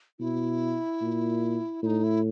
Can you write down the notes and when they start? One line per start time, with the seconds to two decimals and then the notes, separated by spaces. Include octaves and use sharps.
0.19 B2 E4
1.01 A#2
1.83 A2 D#4 E4
2.04 E4